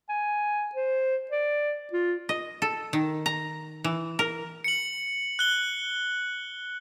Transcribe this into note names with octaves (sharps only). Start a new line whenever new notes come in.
G#5
C5
D5
F4
D#5
A4
D#3
A#5
E3
A#4
C#7 F#7
F#6 G7